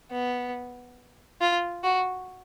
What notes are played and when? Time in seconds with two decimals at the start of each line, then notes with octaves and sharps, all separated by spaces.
0.11 B3
1.41 F4
1.83 F#4